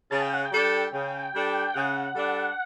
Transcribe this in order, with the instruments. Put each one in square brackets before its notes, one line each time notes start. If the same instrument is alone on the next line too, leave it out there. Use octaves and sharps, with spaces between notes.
[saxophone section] C#3 [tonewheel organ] A5
[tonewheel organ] G5
F#5
G5
[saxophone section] G3 D4 A4
C#3
G3 D4 A4
[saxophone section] C#3 [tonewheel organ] F#5
[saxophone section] G3 D4 A4